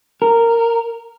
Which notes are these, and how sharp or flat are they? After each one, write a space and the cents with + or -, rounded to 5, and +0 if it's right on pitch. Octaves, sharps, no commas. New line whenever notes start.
A#4 -10